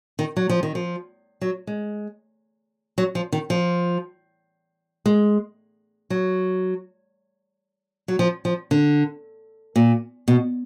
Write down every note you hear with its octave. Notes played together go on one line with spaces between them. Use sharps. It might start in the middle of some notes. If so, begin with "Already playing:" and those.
D#3
F#3
F3
D#3
F3
F#3
G#3
F#3
F3
D#3
F3
G#3
F#3
F#3
F3
F3
D3
A#2
B2